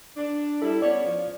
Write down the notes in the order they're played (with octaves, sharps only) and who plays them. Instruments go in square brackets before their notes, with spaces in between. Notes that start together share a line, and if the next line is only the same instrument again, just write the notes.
[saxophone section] D4
[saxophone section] G3 E4 [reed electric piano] A4
[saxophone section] B3 C#4 C#5 [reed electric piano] D5
[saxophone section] F3